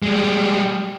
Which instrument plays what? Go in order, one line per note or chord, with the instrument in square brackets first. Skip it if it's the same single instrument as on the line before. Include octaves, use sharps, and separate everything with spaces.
[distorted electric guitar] G3 G#3